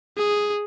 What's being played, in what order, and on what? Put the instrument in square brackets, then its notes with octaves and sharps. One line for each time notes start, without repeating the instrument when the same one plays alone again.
[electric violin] G#4